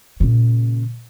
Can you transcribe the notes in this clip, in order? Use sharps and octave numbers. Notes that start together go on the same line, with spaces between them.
A#2 C#3